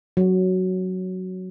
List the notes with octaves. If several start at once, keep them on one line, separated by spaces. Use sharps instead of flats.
F#3